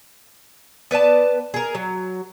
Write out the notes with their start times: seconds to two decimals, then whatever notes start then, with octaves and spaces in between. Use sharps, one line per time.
0.91 B3 B4 D5 A5
1.54 G#4 A#4
1.75 F#3